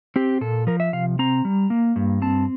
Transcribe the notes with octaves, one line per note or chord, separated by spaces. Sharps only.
C4 G4
A#2 A4
F3 A#4
E5
C3 F5
C4 A#5
G3
A#3
G2
C4 A5